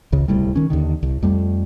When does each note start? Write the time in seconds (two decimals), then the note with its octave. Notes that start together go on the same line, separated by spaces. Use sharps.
0.12 C#2 C#3
0.28 D1 C2 A2 G3
0.56 D#3 C#4
0.70 D#2 D3 D#3
1.03 C2
1.22 F2 G3 A3